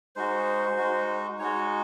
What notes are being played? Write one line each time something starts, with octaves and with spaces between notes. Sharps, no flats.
G#3 D#4 F#4 C5
G#3 D#4 F#4
G#3 D#4 F#4 C#5